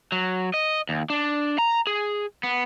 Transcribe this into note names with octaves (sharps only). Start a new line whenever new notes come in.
F#3
D#5
D#2
D4
A#5
G#4
B3